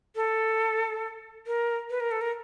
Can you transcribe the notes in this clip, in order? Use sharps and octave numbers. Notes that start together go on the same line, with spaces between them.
A4
A#4
B4
A#4
A4
A#4